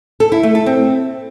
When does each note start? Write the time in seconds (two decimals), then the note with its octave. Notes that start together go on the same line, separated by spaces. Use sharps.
0.20 A4
0.32 E4
0.43 A3
0.55 A4
0.66 C4